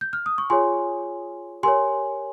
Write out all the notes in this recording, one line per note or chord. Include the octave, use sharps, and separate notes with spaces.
G6
F6
D#6
C#6
F4 G#4 C#5 G#5 C6
G4 A#4 C#5 G#5 C6